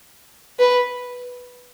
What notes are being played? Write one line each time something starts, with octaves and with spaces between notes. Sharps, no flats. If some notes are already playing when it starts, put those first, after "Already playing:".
B4